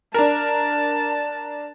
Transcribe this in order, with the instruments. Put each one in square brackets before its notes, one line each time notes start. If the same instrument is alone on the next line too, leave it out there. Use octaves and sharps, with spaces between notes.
[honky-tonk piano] D4 A#4 [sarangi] A5